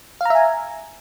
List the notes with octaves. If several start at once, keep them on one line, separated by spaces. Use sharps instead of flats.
E5 F5 G#5 A#5